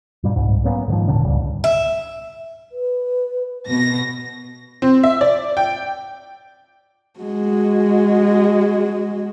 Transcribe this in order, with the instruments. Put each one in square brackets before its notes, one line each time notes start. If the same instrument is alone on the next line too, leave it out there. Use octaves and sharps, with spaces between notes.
[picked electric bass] G2 A#2 G3
C2 G#2
F#3 A#3 B3 C#4
G#2 D3 D#3 F3
E1 A#2 D3 C#4
C#2 G#2 C#3 G3
[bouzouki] E5
[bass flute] B4
[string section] B2 A#6 [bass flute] B3
[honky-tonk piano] C4
E5
D5
G5
[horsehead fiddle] G#3 F#4